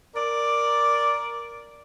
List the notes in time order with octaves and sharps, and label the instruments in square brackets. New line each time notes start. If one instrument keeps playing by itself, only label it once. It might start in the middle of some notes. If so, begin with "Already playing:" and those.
[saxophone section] A#4 D5